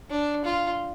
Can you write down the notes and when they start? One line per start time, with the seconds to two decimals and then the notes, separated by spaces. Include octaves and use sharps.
0.10 D4
0.45 F4